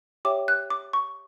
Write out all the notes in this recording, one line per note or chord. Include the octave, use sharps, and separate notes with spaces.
G4 C#5 E5 G5 D6
F#6
D6
C#6